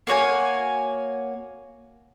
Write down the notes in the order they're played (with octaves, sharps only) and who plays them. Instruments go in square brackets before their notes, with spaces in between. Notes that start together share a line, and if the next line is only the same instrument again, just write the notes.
[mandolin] A#3 F#4 C#5 G#5